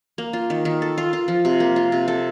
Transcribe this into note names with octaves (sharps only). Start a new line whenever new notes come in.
A#3
F4
D#3
D#3
A4
F4
F4
F3
C3
A#3
F4
C3
A4